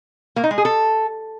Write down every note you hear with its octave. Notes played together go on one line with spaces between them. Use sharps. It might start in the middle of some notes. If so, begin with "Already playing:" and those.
A#3
D#4
G#3
G#4
A4